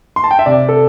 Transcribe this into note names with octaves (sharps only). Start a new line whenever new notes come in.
C6
A5
G5
E5
C3 D5
A4